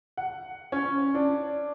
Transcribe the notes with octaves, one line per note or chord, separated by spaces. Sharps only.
F#5
C#4
D4